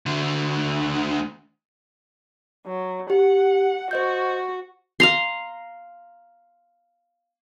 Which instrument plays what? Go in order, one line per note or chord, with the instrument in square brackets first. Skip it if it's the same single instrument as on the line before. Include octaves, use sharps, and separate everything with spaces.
[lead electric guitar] D2 D3
[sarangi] F#3
[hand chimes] G4 [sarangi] F#5
[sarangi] F#4 [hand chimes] C5 D#5 G6
[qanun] F5 A#5 C6